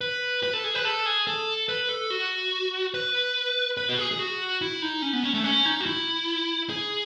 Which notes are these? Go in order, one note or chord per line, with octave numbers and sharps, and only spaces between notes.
B4
B4
A4
G#4
B4
A4
G#4
A4
B4
A4
F#4
B4
B4
F#4
G#4
G#4
F#4
E4
D#4
C#4
B3
C#4
A3
C#4
D#4
F#4
E4
G#4